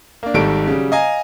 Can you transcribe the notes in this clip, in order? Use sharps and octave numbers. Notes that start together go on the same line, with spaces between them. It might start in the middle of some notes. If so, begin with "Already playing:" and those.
A#3 D4
G#1 D#3 G3 A4 D7
C#3 F#3 G3
D#5 F5 G#5 A#5 A#6